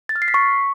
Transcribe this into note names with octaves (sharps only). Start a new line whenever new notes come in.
A6
F6
C7
B6
C#6